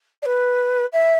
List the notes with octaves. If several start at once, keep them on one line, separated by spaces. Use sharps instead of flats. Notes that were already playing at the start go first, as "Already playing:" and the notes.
D5
B4
E5